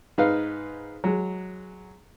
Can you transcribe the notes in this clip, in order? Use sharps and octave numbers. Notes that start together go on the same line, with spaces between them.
G#2 D#4 B4 F5
F#3 G#3